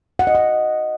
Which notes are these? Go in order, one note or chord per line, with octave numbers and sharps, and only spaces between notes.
F#5
D#5
F#5